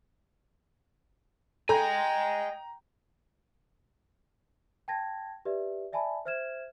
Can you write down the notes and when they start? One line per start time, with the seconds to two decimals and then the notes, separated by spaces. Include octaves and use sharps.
1.69 A4 D#5 G5 G#5 A#5 B5 G6
4.88 G5 A5 G#6 A#6
5.45 G4 B4 D5 E5
5.93 D5 E5 G#5 A5 B5
6.25 C5 E5 F6 G#6 E7